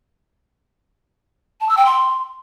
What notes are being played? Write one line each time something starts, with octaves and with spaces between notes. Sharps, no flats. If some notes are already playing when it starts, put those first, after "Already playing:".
A5
E6
G5
C6